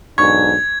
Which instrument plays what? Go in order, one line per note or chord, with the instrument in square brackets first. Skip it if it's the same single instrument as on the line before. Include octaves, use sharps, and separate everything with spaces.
[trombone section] B1 G#2 D4 [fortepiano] C#6 [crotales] G#6